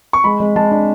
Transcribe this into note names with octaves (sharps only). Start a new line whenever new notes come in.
C#6
G#3 B5
G#3
G#3 A5
D4